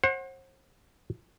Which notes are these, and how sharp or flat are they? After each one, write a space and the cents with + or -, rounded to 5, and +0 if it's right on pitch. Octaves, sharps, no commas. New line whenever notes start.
C5 +40 F#5 +0